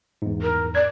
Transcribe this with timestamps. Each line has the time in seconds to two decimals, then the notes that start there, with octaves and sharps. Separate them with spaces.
0.22 E2 G#2
0.42 A#4
0.75 D5 G#6